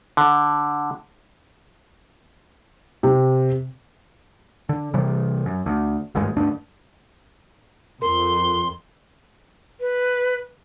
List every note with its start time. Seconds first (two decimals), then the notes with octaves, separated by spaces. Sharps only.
0.17 D3
3.03 C3
4.69 D3
4.94 C3 E3 G3
5.46 F#2
5.66 D2
6.15 G#1 D2 G2 G#3
6.36 D2 G2 D4
8.02 F2 A#4 C6
9.80 B4